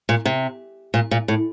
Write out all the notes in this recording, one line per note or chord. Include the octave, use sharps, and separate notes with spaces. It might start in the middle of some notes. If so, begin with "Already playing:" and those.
A#2
C3
A#2
A#2
A2